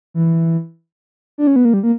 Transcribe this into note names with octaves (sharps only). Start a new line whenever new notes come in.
E3
D4
C#4
B3
A#3
G3
A#3